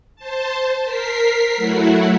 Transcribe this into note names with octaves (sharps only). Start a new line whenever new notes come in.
C5 A5
A#4 B6 C7
F#3 A3 E4 F#4